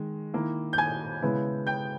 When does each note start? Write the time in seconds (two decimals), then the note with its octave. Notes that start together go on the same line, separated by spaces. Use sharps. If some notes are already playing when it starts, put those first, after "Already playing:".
Already playing: D#3 G#3
0.34 D#3 A#3 E4
0.73 G6
0.78 G#5 G#6
1.22 C#3 G#3 B3 E4
1.67 G5 G6